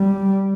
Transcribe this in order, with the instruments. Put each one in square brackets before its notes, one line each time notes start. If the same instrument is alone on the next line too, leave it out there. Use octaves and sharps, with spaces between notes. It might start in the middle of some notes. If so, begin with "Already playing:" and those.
Already playing: [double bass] G3